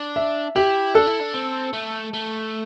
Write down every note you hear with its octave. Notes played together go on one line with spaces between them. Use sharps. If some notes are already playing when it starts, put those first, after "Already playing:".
Already playing: D4
E5
E4 G4
D4 A4
E4
D4
C4
A3
A3